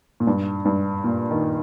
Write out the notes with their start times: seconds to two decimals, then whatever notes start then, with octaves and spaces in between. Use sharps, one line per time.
0.20 A#2
0.27 G2
0.65 G2
1.04 A#2
1.30 D#3